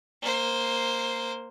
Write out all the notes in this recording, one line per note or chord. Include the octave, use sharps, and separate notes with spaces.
A#3 C5